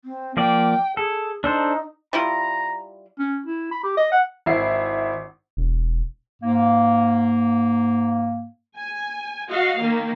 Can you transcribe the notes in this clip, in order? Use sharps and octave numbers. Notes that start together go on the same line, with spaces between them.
C4
F3 A#3 D5 G5
G#4 A4
D4 D#4 A4 C5
G3 E4 F4 A#5
C#4
E4
B5
G4
D#5
F#5
G#1 E4 C7
E1
G#2 A#3
G#5
F#4 D#5 F5
D#3 A#3